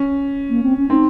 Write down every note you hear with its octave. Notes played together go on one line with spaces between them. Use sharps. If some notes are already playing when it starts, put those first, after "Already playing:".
Already playing: C#4
A#3
C4
C#4
C4 D#4